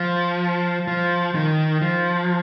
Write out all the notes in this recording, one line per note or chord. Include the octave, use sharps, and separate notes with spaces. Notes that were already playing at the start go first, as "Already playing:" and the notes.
Already playing: F3
F3
D#3
F3